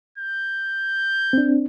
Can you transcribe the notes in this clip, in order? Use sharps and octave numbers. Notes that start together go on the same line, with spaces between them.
G6
C4 D4